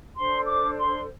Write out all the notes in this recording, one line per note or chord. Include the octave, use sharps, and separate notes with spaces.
D4 A4 C5 C6
D6
C6